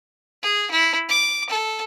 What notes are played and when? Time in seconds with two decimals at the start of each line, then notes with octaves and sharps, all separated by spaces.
0.43 G#4
0.71 E4
1.09 D6
1.50 A4